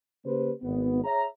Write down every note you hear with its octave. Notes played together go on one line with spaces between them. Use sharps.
C#3 A#3 G4 B4 C5
G#1 B3
G#4 C#5 E5 A#5